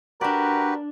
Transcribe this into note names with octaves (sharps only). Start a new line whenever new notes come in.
D4 F#4 G4 A#4 B4 D5